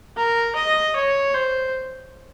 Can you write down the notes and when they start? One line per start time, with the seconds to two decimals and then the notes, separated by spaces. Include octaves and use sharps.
0.16 A#4
0.55 D#5
0.95 C#5
1.34 C5